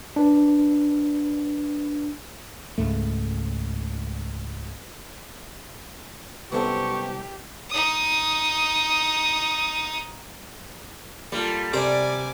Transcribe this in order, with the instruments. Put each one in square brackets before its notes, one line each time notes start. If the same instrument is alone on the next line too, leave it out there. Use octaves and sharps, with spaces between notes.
[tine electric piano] D4 B4
[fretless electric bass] C#2 G#2 A3
[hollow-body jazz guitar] C2 F#2 A4 [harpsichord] B3 C4 [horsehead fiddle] G4 [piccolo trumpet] C#6
[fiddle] D#4 D#6
[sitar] G3 [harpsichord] A#3 [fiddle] F4 A4
[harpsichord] C3 A#4 C5 [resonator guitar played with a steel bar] G4 D5 [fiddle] G#5 D6